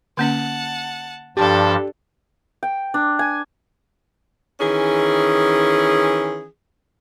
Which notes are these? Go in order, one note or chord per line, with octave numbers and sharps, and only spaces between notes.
D3 A#3 C#4 F#5 A5
G2 F3 D4 G4 A4 A5
G5
D4
G#5
D#3 E3 C#4 G#4